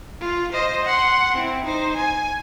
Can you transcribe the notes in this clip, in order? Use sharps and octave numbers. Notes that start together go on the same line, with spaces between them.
F4
C5 D#5
F#5 C6
C4 E4
D#4 C5
G#5